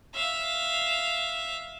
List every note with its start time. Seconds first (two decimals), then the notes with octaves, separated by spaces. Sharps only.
0.14 E5 F5